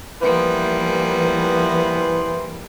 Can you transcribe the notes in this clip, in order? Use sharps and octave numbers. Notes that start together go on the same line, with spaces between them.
E3 F3 G3 A#3 B3 C5